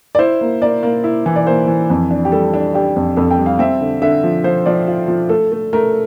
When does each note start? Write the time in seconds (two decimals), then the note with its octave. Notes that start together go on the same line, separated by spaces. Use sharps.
0.15 D5
0.19 E4 C5
0.41 A#3
0.62 A#3 D5
0.83 A#3
1.04 E4
1.26 E3
1.36 D5
1.47 A#3 C5
1.68 E3
1.90 F2
2.11 D4
2.25 G4
2.32 G3 A4
2.54 D4
2.74 D4 G4
2.96 F2
3.16 F2 A4
3.31 G5
3.38 G3
3.46 F5
3.59 C4 E5
3.81 D3
4.02 D3 E5
4.24 F3
4.44 F3 C5
4.66 F3 D5
4.88 F4
5.08 F3
5.29 A3 A4
5.52 A3
5.73 A3 A#4